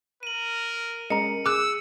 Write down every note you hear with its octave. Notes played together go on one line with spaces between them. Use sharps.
A#4 D#7 F#7
G#3 C#4 A#4 D#5 A#5 C#7
G#4 D6 E6 F#6